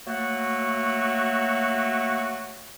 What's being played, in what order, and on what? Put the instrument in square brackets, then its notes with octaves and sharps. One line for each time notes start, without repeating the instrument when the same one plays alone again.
[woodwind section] F#3 A3 A#3 F#4